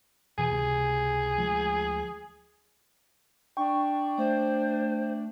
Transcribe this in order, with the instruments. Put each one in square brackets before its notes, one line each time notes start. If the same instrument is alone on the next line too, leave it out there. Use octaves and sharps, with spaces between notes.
[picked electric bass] E2 B2 E3 [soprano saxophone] G#4
[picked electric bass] C#2 C3
D2 F3 G#3
[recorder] D4 [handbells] G5 [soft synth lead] C#6
[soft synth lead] A3 [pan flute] C5